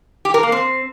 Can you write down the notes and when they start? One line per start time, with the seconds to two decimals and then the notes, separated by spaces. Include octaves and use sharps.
0.25 G4
0.34 A#4
0.43 A#3
0.52 C4